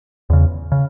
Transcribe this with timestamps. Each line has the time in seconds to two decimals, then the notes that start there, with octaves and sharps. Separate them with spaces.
0.30 E2 C#3
0.72 C#3